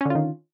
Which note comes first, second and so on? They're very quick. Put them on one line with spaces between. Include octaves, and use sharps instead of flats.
C#4 D3 F4 D#3